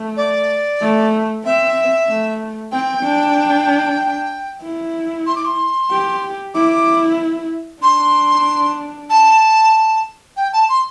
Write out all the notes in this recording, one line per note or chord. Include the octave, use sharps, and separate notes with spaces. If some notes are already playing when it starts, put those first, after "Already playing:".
Already playing: A3
D5
A3
C4 E5
A3
C4 G5
D4
E4
C6
D6
C6
G4
E4 D6
D4 C6
A5
G5
A5
C6